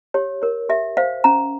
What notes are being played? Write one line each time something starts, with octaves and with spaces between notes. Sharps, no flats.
G4 C#5
A#4 C#5
G4 E5
C5 F5
C#4 A#5